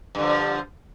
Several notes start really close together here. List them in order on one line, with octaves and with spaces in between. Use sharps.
G2 D3 F3